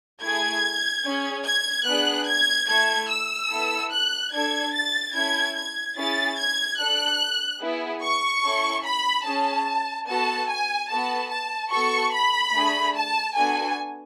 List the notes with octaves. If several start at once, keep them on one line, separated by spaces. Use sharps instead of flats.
A3 E4 G#4 G#6
C#4 G#4
G#6
B3 D4 G#4 F#6
G#6
A3 E4 A4 G#6
E6
B3 E4 A4
F#6
D4 A4 G#6
A6
C#4 E4 A4 G#6
G#6
C#4 E4 G#4 A6
G#6
D4 A4 F#6
B3 E4 G#4
C#6
C#4 E4 A4
B5
C#4 G#4 A5
B3 F#4 A4 A5
G#5
B3 F#4 A4 A5
A5
B3 F#4 A4 C#6
B5
A3 D4 G#4
A5
B3 D4 F#4 A4 G#5